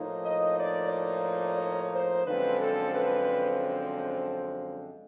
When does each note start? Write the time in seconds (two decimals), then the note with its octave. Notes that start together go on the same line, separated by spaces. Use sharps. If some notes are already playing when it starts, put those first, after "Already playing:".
Already playing: A2 F3 A#3 D#4
0.23 D#5
0.58 D5
0.90 D5
1.58 C#5
1.92 C5
2.25 F#2 D3 F3 G#3 C4 B4
2.59 A4
2.93 B4